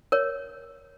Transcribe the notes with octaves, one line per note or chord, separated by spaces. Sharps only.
A#4 C#5